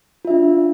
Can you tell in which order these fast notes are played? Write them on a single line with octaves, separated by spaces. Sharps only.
F4 E5 D4